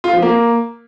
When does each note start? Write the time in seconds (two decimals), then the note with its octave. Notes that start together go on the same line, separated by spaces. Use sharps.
0.04 F4
0.13 F3
0.22 A#3